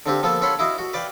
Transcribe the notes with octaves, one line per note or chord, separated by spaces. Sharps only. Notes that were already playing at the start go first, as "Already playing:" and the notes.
D3 C4 F4 G4
F3 A#3 B3 F4 A4
F4 A4 C#5 F#5 B5 C6
E4 F#4 D#5 F5
F#4
B4 D5 F5 G5